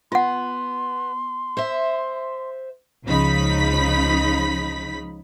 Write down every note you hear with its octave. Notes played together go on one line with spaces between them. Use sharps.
B3 F4 F#5 C6
C5 E5
C#2 C#3 F3 D#4 B5 B6